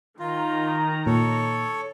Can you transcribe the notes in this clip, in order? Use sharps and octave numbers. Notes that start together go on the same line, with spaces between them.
D#3 F4 A#5
A#2 A4 C#5